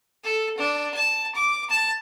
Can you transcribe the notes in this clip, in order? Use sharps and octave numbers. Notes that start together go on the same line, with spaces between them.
A4
D4
A5
D6
A5